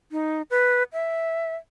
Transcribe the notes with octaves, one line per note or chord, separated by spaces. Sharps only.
D#4
B4
E5